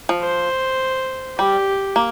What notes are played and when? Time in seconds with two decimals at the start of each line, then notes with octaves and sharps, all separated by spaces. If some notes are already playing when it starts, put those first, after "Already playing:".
0.09 F3
0.23 C5
1.39 G3 G4
1.96 A#3